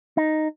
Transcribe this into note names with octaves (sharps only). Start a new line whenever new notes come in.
D#4